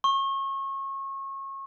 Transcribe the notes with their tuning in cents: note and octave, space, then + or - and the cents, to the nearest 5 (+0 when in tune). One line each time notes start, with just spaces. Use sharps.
C#6 -30